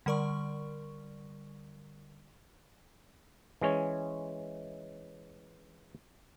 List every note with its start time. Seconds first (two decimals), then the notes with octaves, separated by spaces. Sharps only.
0.06 D3 G3 A#4 D5 C#6
3.61 E3 G#3 C#4 C#5